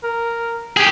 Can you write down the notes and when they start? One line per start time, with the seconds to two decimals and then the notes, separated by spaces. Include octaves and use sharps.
0.04 A#4
0.77 G4 G#4 G#5